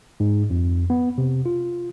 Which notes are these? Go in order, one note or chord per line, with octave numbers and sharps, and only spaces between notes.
G#2
F2
B3
C3
F4